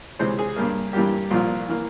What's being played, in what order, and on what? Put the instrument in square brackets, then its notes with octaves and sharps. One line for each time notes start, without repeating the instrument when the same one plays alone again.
[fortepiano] C#2 C3 E3 G#3 C5
G#4
G2 G3 A#3
G2 E3 G3 A#3 G4
C2 A#2 F3 A#3 F4
E3 A#3